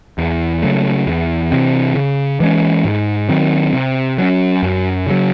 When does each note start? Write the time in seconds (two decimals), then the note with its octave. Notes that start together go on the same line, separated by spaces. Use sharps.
0.18 E2
0.62 C#3 F#3 A3
1.07 E2
1.51 C3 E3 C4
1.95 C#3
2.40 E3 G#3 C#4
2.85 G#2
3.28 D#3 F#3 C4
3.73 C3
4.18 F#3 C#4
4.63 F#2
5.06 C#3 F#3